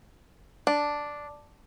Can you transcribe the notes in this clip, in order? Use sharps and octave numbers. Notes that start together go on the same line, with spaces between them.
D4